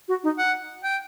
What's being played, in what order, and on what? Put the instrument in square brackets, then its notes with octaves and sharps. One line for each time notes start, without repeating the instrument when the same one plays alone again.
[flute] F#4
D#4
[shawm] F#5
G5